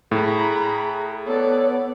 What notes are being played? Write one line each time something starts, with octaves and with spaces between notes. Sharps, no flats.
A2 G#4 A#5 B5
B3 A4 C#5 D5